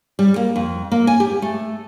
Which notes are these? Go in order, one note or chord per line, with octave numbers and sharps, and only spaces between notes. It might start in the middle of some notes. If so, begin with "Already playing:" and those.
G3
A#3
F2
A#3
G#5
G4
A3